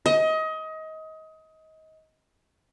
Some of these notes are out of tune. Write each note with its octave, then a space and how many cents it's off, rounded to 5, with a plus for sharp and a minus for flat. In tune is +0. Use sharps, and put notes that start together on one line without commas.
D#5 +25